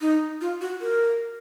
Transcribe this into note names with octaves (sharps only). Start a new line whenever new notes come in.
D#4
F4
F#4
A#4